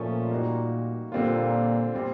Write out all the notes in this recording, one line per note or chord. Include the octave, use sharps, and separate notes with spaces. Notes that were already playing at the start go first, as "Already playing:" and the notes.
Already playing: A#2 F3 A3 C#4
G3 A#3 D#4 F#4
A#2 D3 G3 C4 F4
A#2 G3 C4